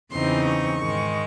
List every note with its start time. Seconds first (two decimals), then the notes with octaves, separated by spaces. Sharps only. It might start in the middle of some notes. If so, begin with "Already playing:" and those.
0.12 E2 C#3 E3 C4 D#4 C6
0.46 C#6
0.80 G#2 D#3 G#3